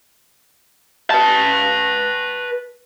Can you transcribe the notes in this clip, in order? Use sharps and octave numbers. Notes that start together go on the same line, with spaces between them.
B4 A5